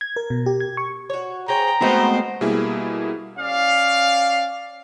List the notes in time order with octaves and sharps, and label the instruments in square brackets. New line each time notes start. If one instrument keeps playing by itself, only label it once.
[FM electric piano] G#6
A#4
B2
G4
G#6
C#6
[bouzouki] F#4 C#5
[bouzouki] G#4 C5 C#5 [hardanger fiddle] G5 [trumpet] A#5
[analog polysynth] G#3 A3 B3 [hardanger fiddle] C4 C5 [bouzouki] F#4 B4 D#5
[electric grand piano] B2 G3 A#3 E4 G#4
[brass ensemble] C#4 D5 F5